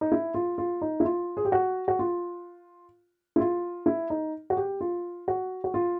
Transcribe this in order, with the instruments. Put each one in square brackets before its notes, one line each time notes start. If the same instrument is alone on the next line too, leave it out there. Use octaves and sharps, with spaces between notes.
[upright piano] D#4
E4
F4
F4
D#4
E4
F4
G#4
G4
F#4
F#4
F4
E4
F4
E4
D#4
F#4
G4
F4
F#4
F#4
F4